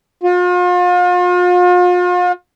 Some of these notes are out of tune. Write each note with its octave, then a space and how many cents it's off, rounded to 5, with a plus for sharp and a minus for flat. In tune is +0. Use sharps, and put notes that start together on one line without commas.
F4 +40